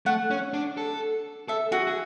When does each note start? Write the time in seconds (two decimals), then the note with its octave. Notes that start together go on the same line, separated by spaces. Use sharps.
0.06 A3 F#5
0.31 C#4
0.54 D4
0.77 A4
1.48 A4 E5
1.72 F#4 G#4
1.87 G#4